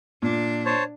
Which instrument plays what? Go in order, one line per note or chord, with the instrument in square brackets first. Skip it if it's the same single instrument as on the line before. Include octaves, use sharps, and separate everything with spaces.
[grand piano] A#2 [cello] D4
[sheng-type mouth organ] C5 C#5 A5